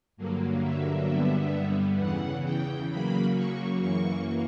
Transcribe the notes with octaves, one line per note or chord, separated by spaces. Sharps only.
G2 D3 F#3 A#3
E5
G2 D3 G3 B3
E2 C#3 E3 F#5
G5
C#3 F#3 A#3 B5
C#6
F#2 E3 A#3 C#6